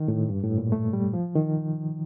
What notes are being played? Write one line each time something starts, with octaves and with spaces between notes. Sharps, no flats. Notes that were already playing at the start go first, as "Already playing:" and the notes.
Already playing: D#3
A2
G2
A2
A#2
A3
G3
F3
D#3